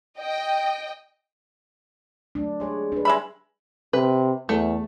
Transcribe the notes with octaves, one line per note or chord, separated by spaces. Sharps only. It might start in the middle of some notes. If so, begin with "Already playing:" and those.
D#5 G5
F#3 A3 D4
G#3 G4 C#5 D5
D4 B4
G3 G#3 E5 B5
C3 B4
E2 A3